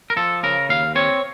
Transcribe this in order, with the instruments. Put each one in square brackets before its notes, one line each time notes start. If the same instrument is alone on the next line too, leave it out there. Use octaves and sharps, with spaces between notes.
[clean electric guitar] A#4
F3 A4
C#3 A#4
D#2 F5
C4 C#5